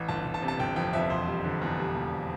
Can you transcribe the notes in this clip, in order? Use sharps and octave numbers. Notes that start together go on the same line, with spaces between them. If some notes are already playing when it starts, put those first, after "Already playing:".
Already playing: A1
G1 A5
G1
A5
C3
A5
G1 G5
F2 G5
F2 E5
E1 C5
G3
D3
E2
G3
E1